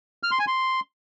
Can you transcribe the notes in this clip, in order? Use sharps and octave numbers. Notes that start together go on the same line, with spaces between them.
F6
C6
G#5
C6